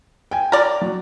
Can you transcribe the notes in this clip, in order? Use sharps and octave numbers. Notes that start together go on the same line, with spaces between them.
G5 G#5
A#4 D5
F#3